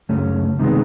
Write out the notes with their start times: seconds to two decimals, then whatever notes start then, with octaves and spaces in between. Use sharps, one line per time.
0.09 C#2 F#2 A3 C#4
0.59 C3 D#3 G3 G#3 B3